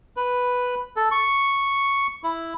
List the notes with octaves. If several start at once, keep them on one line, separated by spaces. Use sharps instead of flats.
B4
A4
C#6
E4